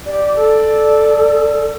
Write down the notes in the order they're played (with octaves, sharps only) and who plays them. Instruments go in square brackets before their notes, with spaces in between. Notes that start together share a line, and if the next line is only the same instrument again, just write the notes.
[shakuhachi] G4 [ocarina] D5
[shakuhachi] A4